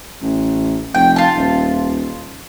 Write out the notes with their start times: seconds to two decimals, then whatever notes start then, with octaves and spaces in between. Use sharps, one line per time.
0.22 A1
0.95 F1 G5
1.16 F4 A5
1.36 D#1